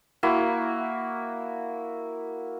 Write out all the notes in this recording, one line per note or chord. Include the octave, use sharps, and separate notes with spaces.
A#3 E4 F#4